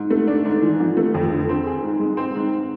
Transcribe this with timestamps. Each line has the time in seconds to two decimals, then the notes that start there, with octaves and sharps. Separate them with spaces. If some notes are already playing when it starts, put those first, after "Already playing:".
Already playing: G#2
0.10 A3
0.28 D4
0.45 G#2
0.62 E3
0.80 F3
0.97 A3
1.14 F2
1.31 D3
1.49 C4
1.66 G#4
1.83 G#2
2.00 G#3
2.17 C4
2.35 G#2